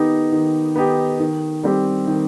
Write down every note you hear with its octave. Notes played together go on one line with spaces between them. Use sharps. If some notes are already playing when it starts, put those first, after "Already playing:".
Already playing: D#3 B3 D#4 G4
D#3
B3 D#4 G4
D#3
G3 C4 G4
D#3